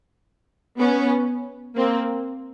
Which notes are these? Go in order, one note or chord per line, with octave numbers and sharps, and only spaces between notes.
B3 C#4
A#3 C4